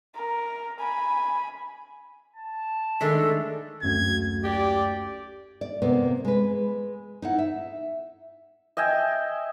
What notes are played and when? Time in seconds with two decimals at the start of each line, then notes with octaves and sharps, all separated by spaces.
0.15 A#4
0.79 G#5 B5
2.36 A5
3.01 D#3 G#3 A3 D4 A4 E6 B6
3.82 F#1 D2 G#6
4.44 G4 D5
5.61 D5
5.82 C3 A#3 B3
6.25 G#3 B4
7.22 D#4 E4 F#5
7.39 E5
8.77 D#5 E5 G5 G#5